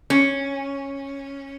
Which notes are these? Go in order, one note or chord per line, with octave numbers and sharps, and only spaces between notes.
C#4